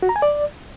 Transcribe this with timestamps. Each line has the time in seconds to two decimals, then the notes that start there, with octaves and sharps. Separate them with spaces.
0.02 F#4
0.09 A#5
0.16 G#5
0.22 D5